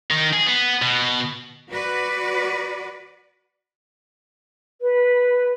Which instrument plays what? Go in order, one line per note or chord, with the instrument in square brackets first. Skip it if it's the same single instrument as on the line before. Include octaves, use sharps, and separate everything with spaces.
[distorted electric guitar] D#3
G#4
B3
B2
[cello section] F#4 B4 D5
[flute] B4